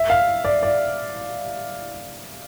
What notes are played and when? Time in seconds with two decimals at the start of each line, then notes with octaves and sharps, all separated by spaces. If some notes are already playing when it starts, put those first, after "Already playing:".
Already playing: E5
0.10 F5
0.45 D5
0.63 D5